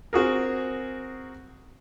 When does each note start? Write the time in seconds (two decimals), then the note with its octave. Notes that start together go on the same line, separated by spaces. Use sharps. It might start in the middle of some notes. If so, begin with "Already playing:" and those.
0.13 C4 F#4 G#4 A#4